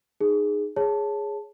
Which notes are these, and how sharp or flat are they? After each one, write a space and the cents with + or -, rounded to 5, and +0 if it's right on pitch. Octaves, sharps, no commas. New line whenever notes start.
D#4 -25 G#4 +0
G#4 +0 C#5 +0 A5 +0